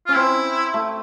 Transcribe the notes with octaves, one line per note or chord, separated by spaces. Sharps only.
C#4 F4
C4 E4
A3